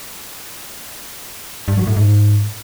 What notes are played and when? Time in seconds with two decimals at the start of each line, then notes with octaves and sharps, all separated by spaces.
1.68 G2
1.77 F#3
1.87 A2
1.96 G#2